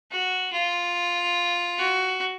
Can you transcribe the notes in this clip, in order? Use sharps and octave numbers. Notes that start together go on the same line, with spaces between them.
F#4
F4
F#4